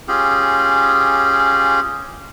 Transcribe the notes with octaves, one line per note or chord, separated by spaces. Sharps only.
C#4 F4 G4 G#4